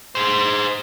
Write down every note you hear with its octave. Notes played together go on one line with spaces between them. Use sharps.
G#4 C5